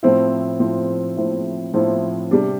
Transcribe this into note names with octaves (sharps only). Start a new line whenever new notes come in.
A2 F3 C4 E4
A2 F3 C4 E4
A2 F3 C4 E4
A2 F3 C4 E4
C3 G3 D4